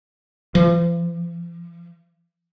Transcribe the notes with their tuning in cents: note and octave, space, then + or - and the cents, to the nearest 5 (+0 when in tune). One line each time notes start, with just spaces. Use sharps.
F3 -40